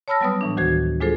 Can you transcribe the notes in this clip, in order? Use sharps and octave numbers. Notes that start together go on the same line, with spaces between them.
C#5 A5 B5 E6 F6 A#6
F#3 G3 B3 B4 D#6
A2 E3 D4
D2 D#3 F#4 C5 G#6
G#3 D4 F4 G#4 A4 C5